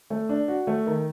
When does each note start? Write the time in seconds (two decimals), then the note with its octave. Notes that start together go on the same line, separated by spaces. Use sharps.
0.10 A3
0.29 D4
0.48 F#4
0.67 A3
0.87 D#3